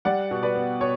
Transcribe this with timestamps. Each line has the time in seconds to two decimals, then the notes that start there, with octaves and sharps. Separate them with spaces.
0.05 G3 D5 F#5
0.31 B2
0.43 B4 D5
0.55 B3
0.81 B2 C#5